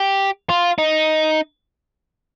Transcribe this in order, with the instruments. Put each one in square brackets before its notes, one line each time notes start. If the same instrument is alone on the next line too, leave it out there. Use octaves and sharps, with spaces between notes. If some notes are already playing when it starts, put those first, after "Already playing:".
Already playing: [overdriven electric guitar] G4
F4
D#4